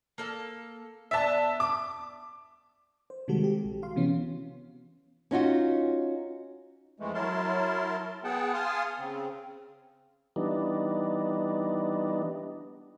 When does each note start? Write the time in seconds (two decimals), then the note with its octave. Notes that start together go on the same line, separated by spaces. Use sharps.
0.18 A#3 A4 F5
1.11 B3 D4 E5 A5
1.60 D6
3.10 C5
3.28 C3 D#3 G3 G#3 F#4 A4
3.44 G4
3.64 A#1
3.82 F#4 F5 C6
3.96 C3 E3 B3 C#4
5.31 C#4 D#4 F4 F#4
7.00 F2 E3 G#3 A3
7.14 F#3 E4 A#4 A5 C6
8.24 B3 G#4 F#5 G5 A5
8.54 F5 G#5 A5 C6 D#6 F6
8.99 C#3 C4
10.36 E3 G3 B3 D4 D#4